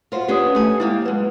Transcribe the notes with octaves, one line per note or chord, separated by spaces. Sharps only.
F4 F#4 C5
B3 C#4 D4 G4 D#6
A3 G#5
G#3 A#3 E4 G4
F#3 G#3 B4